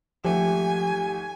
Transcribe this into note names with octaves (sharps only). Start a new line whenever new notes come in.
G#1 F3 A3 G4 G#5